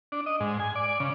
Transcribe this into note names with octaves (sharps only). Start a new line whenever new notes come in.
D4
D#5
G#2
G#5
D5
C#3